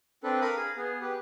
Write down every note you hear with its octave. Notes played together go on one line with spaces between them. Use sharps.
C4 D4 A4 B4
A#4 F5 B5 D#6
G#4 F5
B3 G#4
G4 B4